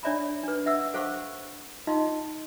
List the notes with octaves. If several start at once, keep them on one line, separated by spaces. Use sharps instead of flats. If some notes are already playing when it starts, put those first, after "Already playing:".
D4 C#5 D5 E5 A#5 B5
D4 B4
E5 F#5 E6
A4 C5 F5 F#5 C#6
D#4 F4 D#5 F5 C6